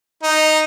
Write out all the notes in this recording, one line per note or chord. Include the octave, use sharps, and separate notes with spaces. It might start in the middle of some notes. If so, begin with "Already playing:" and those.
D#4